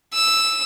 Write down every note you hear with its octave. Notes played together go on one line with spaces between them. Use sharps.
E6